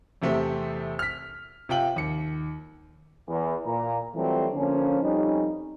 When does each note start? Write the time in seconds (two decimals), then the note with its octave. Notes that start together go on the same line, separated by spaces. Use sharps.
0.22 E2 C3 A3 C4 G4
0.99 F6 B6
1.69 C3 F4 G5 F#7
1.96 D#2 C#7
3.28 E2
3.66 A#2 A#5
4.15 E3 F#3 G3 A3 C4 F4
4.53 D3 F3 A#3 C#4
5.02 F2 G3 C#4 D#4